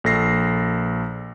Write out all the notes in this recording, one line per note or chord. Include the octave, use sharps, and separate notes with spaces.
A#1 A4 A#6 C7